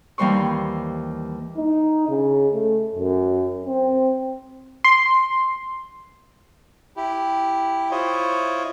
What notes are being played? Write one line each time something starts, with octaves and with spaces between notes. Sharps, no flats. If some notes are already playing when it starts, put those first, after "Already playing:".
D#2 E3 G3 C5 C6 C#6
D#4
C#3
A3
F#2
C4
C6
E4 G4
E4 F4 C5 C#5 D#5